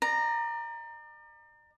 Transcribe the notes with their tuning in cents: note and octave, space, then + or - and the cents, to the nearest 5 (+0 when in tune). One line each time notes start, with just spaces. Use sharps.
D5 +40 A#5 +0